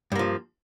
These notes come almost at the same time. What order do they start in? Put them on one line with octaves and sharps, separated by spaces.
G2 A#3 F3